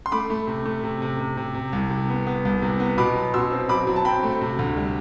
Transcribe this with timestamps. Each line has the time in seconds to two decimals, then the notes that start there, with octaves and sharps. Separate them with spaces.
0.06 C6
0.12 A3 B5 D6
0.30 A3
0.47 C3
0.66 A3
0.83 C3
1.02 C3
1.20 C3
1.37 C3
1.54 C3
1.73 C2
1.90 C3
2.09 B3
2.27 B3
2.45 C2
2.62 C3
2.80 B3
2.98 B2 B5 D6
3.16 F#3
3.34 B2 C6 E6
3.52 C4
3.69 F#3 B5 D6
3.87 F#3
3.96 A5
4.05 C4 G5 B5
4.23 A3
4.41 C3
4.59 D2
4.77 G3